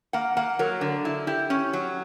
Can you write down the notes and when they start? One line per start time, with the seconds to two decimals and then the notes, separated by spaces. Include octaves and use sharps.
0.13 A#3 F#5
0.37 A#3 F#5
0.59 F#3 A#4
0.81 D3
1.05 E4
1.27 E4 G4
1.50 C#4
1.73 F#3